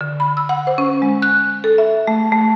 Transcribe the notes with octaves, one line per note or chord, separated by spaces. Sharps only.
D3
B5
E6
F#5
C5
C#4
G#3
F#6
A4
E5
A3
A3